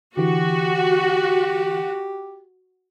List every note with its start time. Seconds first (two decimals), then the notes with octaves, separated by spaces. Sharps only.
0.17 D3 E3 F#4 G4